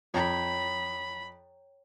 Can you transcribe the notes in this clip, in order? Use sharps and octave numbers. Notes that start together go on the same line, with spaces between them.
F2 C#5 G5 A#5 B5